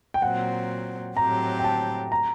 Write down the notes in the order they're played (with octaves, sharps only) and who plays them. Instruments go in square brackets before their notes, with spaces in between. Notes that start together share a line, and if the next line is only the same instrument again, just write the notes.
[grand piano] G5
[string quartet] A#2 F#3 C4 [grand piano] F#5
[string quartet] A2 F#3 C4 G4 [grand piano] A#5
[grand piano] G5
A5
A#5